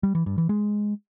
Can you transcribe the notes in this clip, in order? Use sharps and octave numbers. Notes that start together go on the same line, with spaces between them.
G3
E3
G2
E3
G#3